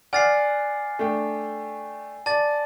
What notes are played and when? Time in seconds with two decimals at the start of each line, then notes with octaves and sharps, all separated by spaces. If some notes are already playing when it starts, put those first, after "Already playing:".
0.13 D5 F#5 G#5 F6 A6 C7
0.99 A3 D4 G5
2.26 D5 A5 A6